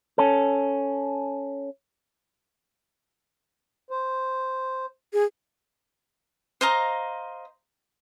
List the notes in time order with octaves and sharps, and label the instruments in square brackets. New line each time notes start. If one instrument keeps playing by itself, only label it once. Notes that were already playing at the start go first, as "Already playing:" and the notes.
[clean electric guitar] C#4 A4
[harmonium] C5
[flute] G#4
[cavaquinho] C5 D#5 F5 A#5